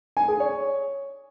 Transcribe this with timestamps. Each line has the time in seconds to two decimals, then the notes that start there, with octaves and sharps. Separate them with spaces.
0.17 G#5
0.28 G#4
0.40 C#5